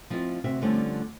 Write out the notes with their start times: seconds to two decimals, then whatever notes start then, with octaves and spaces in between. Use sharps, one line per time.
0.10 F3 C4 E4 F4 D#5
0.44 D2 C3 C4 F#4 E5
0.62 D3 F3 G3 A3 C4 C#4